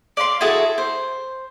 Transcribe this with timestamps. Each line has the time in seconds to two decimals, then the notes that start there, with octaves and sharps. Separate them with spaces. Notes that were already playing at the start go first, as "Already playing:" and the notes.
0.17 D5 F5 B5 C6
0.41 E4 F#4 G#4 A4
0.78 C5